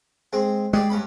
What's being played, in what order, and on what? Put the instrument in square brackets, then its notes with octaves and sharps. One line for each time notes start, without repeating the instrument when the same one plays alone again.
[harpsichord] G#3 C4
[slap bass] G#3 [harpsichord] G4 G#4 D5
[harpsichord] G2 C#4 B5